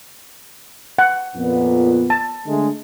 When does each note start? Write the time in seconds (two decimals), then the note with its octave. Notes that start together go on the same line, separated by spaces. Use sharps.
0.99 F#5
1.36 F2 A#2 B3
2.10 A5
2.46 D3 G#3 A3